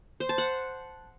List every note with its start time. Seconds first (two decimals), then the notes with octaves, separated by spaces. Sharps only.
0.20 C5
0.29 A5
0.38 F#5